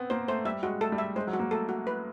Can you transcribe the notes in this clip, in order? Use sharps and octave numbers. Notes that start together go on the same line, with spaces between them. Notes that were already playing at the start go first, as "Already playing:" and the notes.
Already playing: B3 C4
A#3 C5
A3 C5
G3 E5
G#3 F#4
A3 A4
G3
E5
G#3 C5
F#3
F#4
A#3
A3 A4
F#4
B4